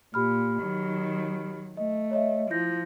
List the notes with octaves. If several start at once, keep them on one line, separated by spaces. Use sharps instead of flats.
A#2 G4 B5 F6
D#3 F#3
A3 D#5
C#5 D#5 E5
F3 E4 G6 A#6